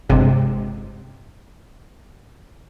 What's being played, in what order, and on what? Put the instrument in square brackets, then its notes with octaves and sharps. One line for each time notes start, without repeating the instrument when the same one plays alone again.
[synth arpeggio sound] G1 C3 G#3